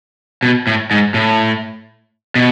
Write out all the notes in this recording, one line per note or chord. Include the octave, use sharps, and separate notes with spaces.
B2
A2
G#2
A2
B2